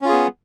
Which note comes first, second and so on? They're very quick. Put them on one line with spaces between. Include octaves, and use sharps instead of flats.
C#4 F4 G#4 B3